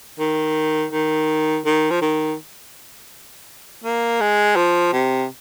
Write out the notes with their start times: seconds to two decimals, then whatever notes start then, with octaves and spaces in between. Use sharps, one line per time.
0.19 D#3
0.92 D#3
1.65 D#3
1.90 F3
2.01 D#3
3.84 A#3
4.20 G#3
4.56 F3
4.93 C3